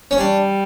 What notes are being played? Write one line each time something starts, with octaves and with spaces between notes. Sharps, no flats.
C#4
G3 D4